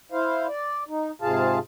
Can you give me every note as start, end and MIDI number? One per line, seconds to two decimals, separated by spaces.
0.12 0.47 64
0.12 0.47 72
0.12 0.47 77
0.47 0.84 74
0.88 1.11 63
1.22 1.59 44
1.22 1.59 48
1.22 1.59 65
1.22 1.59 68
1.22 1.59 77
1.22 1.59 81